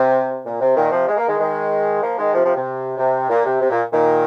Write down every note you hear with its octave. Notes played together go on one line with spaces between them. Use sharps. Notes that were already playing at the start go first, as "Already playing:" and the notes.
Already playing: C3
A#2
C3
A#2 D#3
C3 F3
G#3
A#3
D#3 G#3
D#3 G#3
F3 A#3
D#3 G#3
C3 F3
C3 F3
C3
C3
A#2
C3
C3
A#2
A#2 D#3